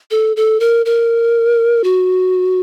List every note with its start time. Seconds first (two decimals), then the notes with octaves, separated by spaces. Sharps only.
0.11 A4
0.36 A4
0.60 A#4
0.86 A#4
1.84 F#4